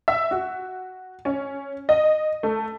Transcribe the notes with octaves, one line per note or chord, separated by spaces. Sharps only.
E5
F#4
C#4
D#5
A3